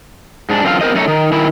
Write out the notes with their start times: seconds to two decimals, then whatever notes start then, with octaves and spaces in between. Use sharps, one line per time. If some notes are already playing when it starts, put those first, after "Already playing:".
0.49 G#2 D4
0.64 F#2 D3 C4 F4 G4 F5
0.81 B3 C4 A#4 C5 D#5
0.94 F#2 A3 D#4 C#5
1.08 D#3
1.32 D#3 E4